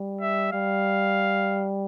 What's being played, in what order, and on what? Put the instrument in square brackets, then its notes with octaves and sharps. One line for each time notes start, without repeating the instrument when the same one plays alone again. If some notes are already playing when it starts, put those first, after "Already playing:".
Already playing: [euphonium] G3
[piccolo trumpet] E5
[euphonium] G3 [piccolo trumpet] F5